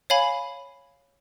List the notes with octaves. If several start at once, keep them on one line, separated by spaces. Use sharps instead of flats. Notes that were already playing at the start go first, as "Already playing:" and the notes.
C#5 F5 G#5 B5